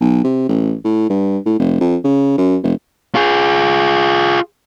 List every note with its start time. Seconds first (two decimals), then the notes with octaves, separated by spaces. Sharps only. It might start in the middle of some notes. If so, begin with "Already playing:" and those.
0.01 B1
0.24 C3
0.49 A1
0.84 A2
1.10 G2
1.46 A2
1.59 F1
1.81 F2
2.04 C#3
2.38 F#2
2.63 F1
3.15 F4 G#4